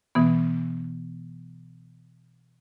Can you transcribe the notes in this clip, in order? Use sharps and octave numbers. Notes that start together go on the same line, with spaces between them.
B2 E3 B3